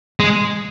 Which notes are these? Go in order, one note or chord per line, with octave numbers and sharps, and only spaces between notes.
G#3